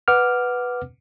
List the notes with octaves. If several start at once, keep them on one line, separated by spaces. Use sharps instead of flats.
B4 F#5 D6 F6